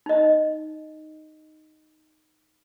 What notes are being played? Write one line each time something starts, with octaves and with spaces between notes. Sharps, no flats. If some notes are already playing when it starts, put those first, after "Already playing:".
D#4 D#5